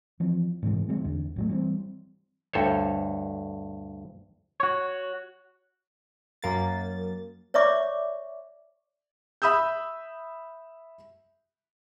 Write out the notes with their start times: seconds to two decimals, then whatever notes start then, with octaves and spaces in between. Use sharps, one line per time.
0.20 E3 F3 C4
0.62 G#2 C3 E3 G#3
0.89 D#3 F#3 G#3 C4
1.04 E2 D3
1.36 A1 F#3 A3
1.49 E3 G3 G#3 C4
2.53 D2 G2 A4 C5 C#5
4.60 F#4 C#5
6.42 F#2 A#3 A6
7.54 C#5 D5 E5 C#6 D6
9.42 E5 B5 D#6 E6 G6